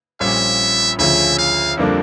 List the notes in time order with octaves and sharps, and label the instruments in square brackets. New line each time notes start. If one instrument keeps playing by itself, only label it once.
[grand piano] A#1 A#2 G3 C#4 [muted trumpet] E5
[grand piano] D2 C#3 F3 C#4 [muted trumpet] E5
[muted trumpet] F5
[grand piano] F2 D3 G3 A#3 D4